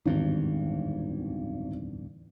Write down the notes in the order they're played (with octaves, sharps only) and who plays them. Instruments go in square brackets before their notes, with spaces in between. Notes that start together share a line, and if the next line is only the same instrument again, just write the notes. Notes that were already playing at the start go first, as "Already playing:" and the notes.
[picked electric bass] D1 E2 G2 [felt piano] G#1